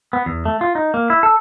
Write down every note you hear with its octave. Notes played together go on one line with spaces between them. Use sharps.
B3
E2
A3
F4
D#4
A#3
E4
A4